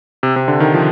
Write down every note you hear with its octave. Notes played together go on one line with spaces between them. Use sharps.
C3
C3
D3
D#3
F3